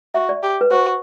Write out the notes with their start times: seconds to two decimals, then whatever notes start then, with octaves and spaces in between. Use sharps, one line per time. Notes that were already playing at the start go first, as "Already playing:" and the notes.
0.14 F#4 E5
0.29 D5
0.43 G4
0.61 B4
0.71 F#4 C5